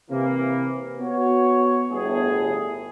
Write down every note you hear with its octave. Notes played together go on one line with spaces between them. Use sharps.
C3 E3 A#3
B3 F#4 C#5
G1 A2 G#4